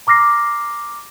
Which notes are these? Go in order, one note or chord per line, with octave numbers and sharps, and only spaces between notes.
A#5 D6 F6 A#6 C7